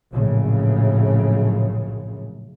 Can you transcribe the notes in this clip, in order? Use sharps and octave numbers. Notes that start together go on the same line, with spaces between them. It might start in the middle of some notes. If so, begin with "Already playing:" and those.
A#1 F#2 A2 C#3